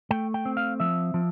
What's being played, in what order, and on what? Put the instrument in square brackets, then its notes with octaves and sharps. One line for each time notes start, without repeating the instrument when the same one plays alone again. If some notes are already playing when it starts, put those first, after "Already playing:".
[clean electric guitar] A3 G5
G5
C4
F5
F3 E5
F3